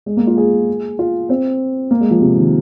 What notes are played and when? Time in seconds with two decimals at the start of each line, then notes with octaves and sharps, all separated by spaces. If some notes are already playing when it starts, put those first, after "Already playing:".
0.06 G#3
0.17 A#3
0.27 F4
0.37 G#4
0.99 F4
1.29 C4
1.91 A#3
2.01 G#3
2.11 F3
2.21 C3
2.37 D#3